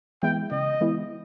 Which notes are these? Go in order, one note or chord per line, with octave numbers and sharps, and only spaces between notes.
E3 G#3 B3 E4 G5
C#3 D#5
E3 G#3 B3 E4